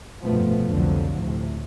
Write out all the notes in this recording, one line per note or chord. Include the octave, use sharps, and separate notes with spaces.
F1 G2 B2 F3 A3 B3
C2 F2 D3 F3 F#3
D2 A2 C3